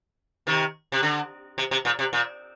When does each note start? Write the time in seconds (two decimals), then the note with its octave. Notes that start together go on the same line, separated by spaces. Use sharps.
0.47 C3 D#3
0.92 C3
1.03 D3
1.58 C3
1.71 C3
1.85 A#2
1.99 C3
2.13 A#2